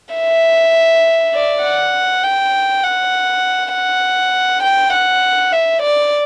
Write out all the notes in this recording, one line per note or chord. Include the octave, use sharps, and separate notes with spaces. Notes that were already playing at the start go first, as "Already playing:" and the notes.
E5
D5
F#5
G5
F#5
F#5
G5
F#5
E5
D5